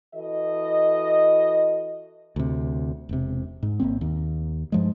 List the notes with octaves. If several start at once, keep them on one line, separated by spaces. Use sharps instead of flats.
E3 F#4 A4 D#5
D2 C3
E1 C3
G#2
G#1 F#2 A#3 C4
D#2
G2 F3 G#3